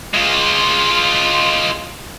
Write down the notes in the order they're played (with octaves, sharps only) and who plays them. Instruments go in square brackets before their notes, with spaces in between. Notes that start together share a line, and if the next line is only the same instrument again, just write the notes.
[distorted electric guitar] G#3 F4